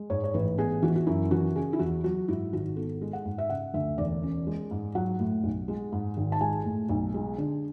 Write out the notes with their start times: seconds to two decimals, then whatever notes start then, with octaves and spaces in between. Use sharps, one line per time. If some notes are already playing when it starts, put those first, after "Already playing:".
Already playing: G#3
0.10 G#2 C#5
0.24 C#5
0.34 A1 B4
0.58 B3 G#4
0.82 E3 F#4
0.96 F#4
1.07 F#2 E4
1.31 E3 F#4
1.55 C#3 G#4
1.73 E4
1.79 E2 F#4
2.04 F#3 F#4
2.28 G#2 E4
2.53 G#1 F#4
2.76 B3 A4
3.01 G#3
3.13 F#5
3.25 G#2
3.38 E5
3.50 C#3 F#5
3.74 D2 E5
3.98 E1 D5
4.23 C#4
4.47 G#3
4.71 G#2
4.95 F#3 F#5
5.20 A2
5.44 B1
5.68 G#3
5.92 G#2
6.17 G#1
6.32 A5
6.41 G#3 G#5
6.65 A2
6.89 B1
7.14 G#3
7.38 D3